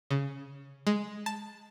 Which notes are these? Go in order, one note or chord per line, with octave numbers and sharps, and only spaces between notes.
C#3
G#3
A5